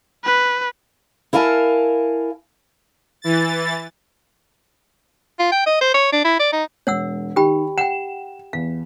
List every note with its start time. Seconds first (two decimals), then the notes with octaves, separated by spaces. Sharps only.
0.24 B4
1.33 E4 A#4 F5 G#5 A5
3.22 E3 A6
5.39 F4
5.52 G5
5.66 D#5
5.81 C5
5.94 C#5
6.12 D4
6.24 E4
6.39 D5
6.52 D#4
6.87 E1 C#5 F#5 E6
7.36 D#3 G4 G5 B5
7.78 F#5 G5 E7
8.53 E2 F5